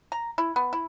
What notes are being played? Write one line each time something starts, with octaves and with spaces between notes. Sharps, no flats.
A#5
E4
B3
E4